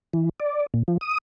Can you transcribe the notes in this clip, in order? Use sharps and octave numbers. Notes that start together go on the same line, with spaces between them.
E3
D5
A#2
F3
D#6